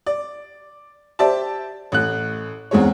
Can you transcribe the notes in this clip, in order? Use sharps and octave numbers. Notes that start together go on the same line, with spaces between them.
D5
G4 C5 D5 E5 A5
A1 A2 F#6
E2 G#2 G#3 C4 C#5